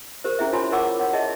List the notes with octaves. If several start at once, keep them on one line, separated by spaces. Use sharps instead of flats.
G4 A#4 C5
C#4 E4 G#4 E5
E4 F4 C#5 G#5 B5 C6
A#4 C#5 F#5 C#6 D6 E6
C#5 F#5
G#4 D#5 E5 A5